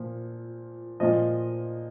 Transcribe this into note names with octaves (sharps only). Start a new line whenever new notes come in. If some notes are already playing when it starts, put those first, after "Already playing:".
Already playing: A#2 F3
A#2 F3 D#5